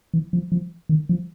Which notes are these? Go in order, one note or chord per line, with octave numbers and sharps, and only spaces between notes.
E3
F3
F3
D#3
F3